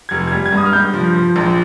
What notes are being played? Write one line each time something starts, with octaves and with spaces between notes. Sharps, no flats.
F1 G#6
G3 G#6
G#6
G2 D#6
F6
G2 G6
F3
F3
A#1